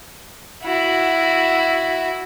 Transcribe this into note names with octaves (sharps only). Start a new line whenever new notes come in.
E4 F#4